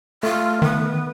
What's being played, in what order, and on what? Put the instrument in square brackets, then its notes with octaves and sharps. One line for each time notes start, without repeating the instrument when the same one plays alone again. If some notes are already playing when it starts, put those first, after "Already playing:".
[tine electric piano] A3 [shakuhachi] F4
[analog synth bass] D#3 [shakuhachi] B3